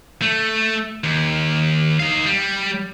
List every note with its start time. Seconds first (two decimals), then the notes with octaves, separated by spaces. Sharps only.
0.22 A3
1.04 D#2
2.00 D#4 F5
2.26 G3